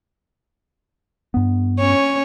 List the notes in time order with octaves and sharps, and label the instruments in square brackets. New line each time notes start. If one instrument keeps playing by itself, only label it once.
[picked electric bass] G2 B3
[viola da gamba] C#4 C#5